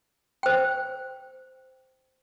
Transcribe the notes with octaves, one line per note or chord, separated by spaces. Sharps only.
C5 G5